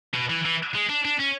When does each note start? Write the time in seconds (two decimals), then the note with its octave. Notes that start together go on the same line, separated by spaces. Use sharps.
0.14 B2
0.29 E3
0.45 E3
0.74 G#3
0.89 D4
1.05 D4
1.20 C#4